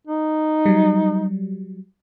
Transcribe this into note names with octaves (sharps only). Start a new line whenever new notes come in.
D#4
F#3 G3